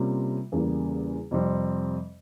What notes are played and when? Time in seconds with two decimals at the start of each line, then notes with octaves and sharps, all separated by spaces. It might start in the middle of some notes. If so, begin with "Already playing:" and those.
Already playing: C3 G3 A#3 C#4 F4
0.52 E2 C#3 G3 A#3
1.31 F2 C3 G3 C4